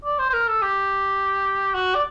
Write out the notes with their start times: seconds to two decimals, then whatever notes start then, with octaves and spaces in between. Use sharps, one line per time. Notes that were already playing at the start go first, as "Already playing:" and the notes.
0.05 D5
0.19 C5
0.29 C5
0.33 A#4
0.48 A4
0.62 G4
1.74 F#4
1.95 D5